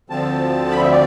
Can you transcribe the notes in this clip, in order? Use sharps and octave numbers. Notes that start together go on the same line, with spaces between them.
D2 D3 F3 C4 A5
B5
E5
D5